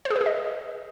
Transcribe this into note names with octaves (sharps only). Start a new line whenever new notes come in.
C5
G#4
B4
G#4
D#5